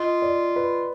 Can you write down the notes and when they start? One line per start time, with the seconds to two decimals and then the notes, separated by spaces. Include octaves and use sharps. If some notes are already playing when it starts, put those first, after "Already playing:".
Already playing: F4 D#5
0.22 D5
0.56 B4